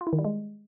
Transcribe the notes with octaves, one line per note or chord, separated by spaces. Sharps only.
F4
E4
D#3
G3
G#3